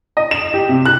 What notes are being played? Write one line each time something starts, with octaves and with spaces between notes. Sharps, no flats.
D#5
E7
G4
C3
F#6